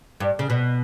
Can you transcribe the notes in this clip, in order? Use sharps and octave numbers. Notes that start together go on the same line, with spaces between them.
G2
C#3
B2